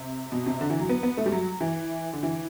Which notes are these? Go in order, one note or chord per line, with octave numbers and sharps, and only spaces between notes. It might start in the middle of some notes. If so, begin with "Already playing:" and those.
Already playing: C3
B2
C3
D3
E3
F#3
B3
B3
A3
G3
F#3
E3
D3
E3